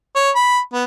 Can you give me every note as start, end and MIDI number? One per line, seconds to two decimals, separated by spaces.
0.16 0.30 73
0.35 0.59 83
0.73 0.84 59